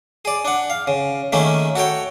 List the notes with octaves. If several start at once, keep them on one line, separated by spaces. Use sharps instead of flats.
G#4 D5
D4 F#5
F5
C#3
D#3 A3 A#3 C#4 G#4
F#4 A4 C#5 G5